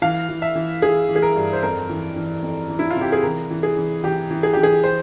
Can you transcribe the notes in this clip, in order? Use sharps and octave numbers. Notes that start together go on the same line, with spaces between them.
E3 F5
E3
E5
E3
E3 G#4
E3
G#4
A#4
G2
C5
F2 A#4
E3
E3
F2
E3
E4
F4
C3 G4
G#4
E3 A#4
E3
G#4
E3
E3 G4
E3
G#4
E3 G4
G#4
C5